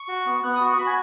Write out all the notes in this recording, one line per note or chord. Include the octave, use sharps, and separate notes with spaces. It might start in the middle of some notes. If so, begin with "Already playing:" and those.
Already playing: C#6
F#4
B3
B3 F#6
D#6
F#4
C#6
F#4 B5
G#5